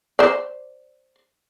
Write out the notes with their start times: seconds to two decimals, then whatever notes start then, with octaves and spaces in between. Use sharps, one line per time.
0.19 C5 D5